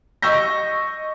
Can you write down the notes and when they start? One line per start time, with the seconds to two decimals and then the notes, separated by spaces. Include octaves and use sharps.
0.22 D#5 C#6 E6 G6 A#6